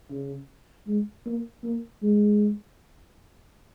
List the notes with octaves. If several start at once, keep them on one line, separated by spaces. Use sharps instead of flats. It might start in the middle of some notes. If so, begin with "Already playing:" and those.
C#3
G#3
A#3
A#3
G#3